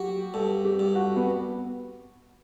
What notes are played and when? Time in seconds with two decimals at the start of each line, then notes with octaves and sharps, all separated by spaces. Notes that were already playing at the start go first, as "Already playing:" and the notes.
Already playing: F#3 F#4 G4
0.34 G2 A4
0.65 G4
0.79 G2
0.95 F#4
1.16 B3